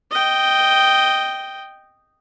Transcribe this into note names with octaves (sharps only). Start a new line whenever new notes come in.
D#5 G5